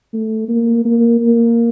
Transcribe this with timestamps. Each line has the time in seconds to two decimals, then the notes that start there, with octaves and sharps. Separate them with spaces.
0.13 A3
0.49 A#3
0.85 A#3
1.20 A#3